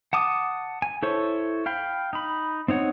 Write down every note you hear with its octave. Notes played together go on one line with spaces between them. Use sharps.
F#5 A5 D6 D#6
G#5
E4 A4 C5 C#5
F5 G5 B5
D#4 B5
C4 D#4 C#5 F#5